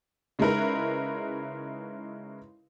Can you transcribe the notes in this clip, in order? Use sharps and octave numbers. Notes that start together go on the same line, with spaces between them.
C#3 G#3 D#4 E4 A#4 B4